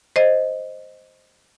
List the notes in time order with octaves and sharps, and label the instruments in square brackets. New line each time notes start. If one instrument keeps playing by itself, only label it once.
[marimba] C5 D#5